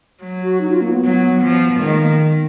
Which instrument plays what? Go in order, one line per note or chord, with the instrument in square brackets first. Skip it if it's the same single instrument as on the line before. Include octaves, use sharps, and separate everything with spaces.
[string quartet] F#3
[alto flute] F#4
D#4
F4
A#3
B3
[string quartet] F#3
F3
[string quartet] D#3 [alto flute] G#3
[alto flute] A#3